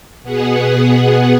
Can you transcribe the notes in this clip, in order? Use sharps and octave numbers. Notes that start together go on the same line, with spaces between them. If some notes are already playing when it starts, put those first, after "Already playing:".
B2 B3 G#4 F#5